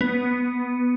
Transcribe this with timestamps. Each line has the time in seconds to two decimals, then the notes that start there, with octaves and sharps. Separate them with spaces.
0.01 B3